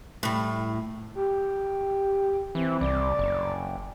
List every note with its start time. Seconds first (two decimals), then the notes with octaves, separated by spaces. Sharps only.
0.23 A2 G3
1.15 G4
2.55 E3 C4
2.81 C2 D5
3.19 F#1